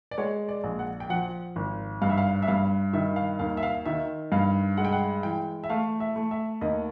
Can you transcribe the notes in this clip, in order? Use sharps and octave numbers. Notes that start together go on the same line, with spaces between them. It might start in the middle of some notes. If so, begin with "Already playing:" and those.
D5
G#3 C#5
D5
A#1
F#5
G5
F3 F#5
G#1
G2 F5
E5
F5
E5
G2 F5
D#3 E5
F5
D#2 F5
E5
F5
D#3 E5
G2 F5
G#3 F#5
G5
F#5
E3 G5
E5
A3 F5
E5
A3
E5
D#2 D#5